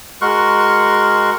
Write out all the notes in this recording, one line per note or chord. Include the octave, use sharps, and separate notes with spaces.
G#3 F#4 A#4 C6 C#6 F#6